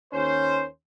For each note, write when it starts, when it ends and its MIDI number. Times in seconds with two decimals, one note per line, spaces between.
0.13 0.64 39
0.13 0.64 61
0.13 0.64 72